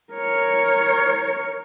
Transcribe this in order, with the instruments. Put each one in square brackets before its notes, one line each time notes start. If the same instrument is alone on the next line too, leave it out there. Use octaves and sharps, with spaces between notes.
[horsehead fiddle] A#4 C#5